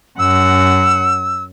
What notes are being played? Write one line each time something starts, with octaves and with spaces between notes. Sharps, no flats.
F#2 F#5 E6